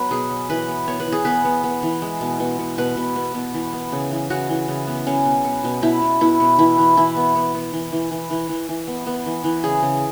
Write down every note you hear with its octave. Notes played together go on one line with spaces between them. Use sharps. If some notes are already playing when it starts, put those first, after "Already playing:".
Already playing: F#3 B3 B4
B2 G#4
F#3
E3 B4
B3
B3 C#5
B4
E3
G#4
B3 B4
B3
B3
E3
G#3
B2
B2
B2
B2 B4
B2
B3
B2
E3
B3
C#3
E3
C#3 F#4
E3
C#3
B3
F#3 C#4
B2
B3
B2
B2 E4
B2
B2 E4
B2
E3 E4
E3
E3 E4
B3
B3
B3
E3
E3
E3
E3
E3
E3
B3
B3
E3
E3
C#3 G#4
C#3